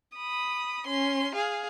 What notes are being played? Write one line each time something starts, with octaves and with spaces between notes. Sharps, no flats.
B5 D#6
C#4 C6
G#4 F5